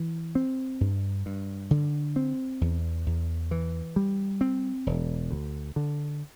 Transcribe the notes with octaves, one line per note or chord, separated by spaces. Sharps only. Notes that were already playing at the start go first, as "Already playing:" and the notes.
Already playing: E3
C4
G2
G2
D3
C4
E2
E2
E3
G3
C4
E1
D2
D3